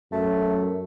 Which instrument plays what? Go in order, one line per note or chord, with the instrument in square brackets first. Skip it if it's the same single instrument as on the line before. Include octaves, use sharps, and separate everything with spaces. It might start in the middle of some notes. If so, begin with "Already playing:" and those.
[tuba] F#2 [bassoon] A3